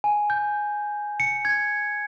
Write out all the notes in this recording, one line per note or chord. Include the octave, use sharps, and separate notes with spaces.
G#5
G6
C#7
G#6